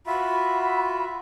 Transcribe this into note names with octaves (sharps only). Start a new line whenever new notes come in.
F4 F#4 E5 B5